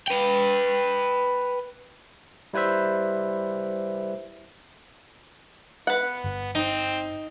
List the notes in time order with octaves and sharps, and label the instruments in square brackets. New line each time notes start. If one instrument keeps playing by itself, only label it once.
[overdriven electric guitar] B4 G5
[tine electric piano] G3 E4 B4 C5 E5
[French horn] B3 [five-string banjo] B4 F#5
[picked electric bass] G1
[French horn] C4 [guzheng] D#4